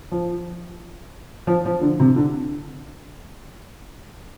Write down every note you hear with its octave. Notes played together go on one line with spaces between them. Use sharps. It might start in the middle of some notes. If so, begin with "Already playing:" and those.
F3
F3
F3
D3
C3
D3